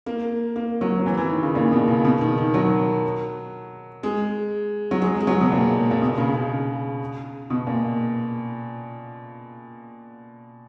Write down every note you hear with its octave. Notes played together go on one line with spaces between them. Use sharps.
A#3
A#3
F#3
F#3
E3
E3
D#3
C#3
A#2
B2
C#3
B2
D#3
D#3
F#3
G#3
F#3
G#3
G#3
F#3
B2
A#2
A#2
B2
C#3
C#3
B2
A#2